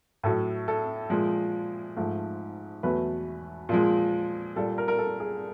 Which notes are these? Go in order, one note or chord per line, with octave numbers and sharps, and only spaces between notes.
A2 F#3 A3 A4
A4
A#2 F3 G#3
G#2 F3 A3
E2 B2 F#3 A3 B4
A#2 F3 G#3
A#2 G3 A4
A#4
A#4
A4
G#4